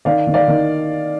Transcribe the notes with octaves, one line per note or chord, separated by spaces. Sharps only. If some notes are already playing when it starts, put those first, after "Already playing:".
D#3 D5 F5
D#3
D5 F5
D#3